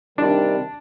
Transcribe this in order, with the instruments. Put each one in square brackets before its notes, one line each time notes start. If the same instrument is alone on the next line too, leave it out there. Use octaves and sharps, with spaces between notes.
[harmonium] C3 D#3 G3 [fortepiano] D4